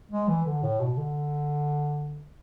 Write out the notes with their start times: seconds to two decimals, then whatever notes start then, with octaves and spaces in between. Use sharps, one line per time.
0.11 G#3
0.28 E3
0.46 D3
0.62 A2
0.80 B2
0.97 D3